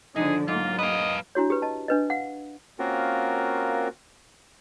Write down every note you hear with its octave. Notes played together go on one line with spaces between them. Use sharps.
D3 F3 D4 D#4 G#4
G#2 F#3 A#3 F4
B4 D#5 F5
D4 E4 F#4 C#5
G4 B4
D#5 A5
D4 B4 D#5
F5 F#5
A#3 C4 C#4 F4 F#4 A#4